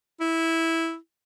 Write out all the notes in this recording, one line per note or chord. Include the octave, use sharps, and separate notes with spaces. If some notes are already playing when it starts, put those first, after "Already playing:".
E4